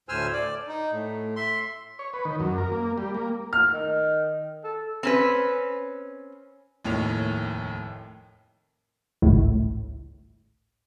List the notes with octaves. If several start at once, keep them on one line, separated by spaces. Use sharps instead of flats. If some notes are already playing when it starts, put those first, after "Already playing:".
D2 A2 C5 G#5 E6 F6
D5
D#4
A2
E5 C6
C#5
B4
D#3
F#2
A#4
A#3
G3
A#3
F6
D#3
A4
C4 C#4 B4
F1 D#2 A2 C#5 F7
G#1 C#2 A2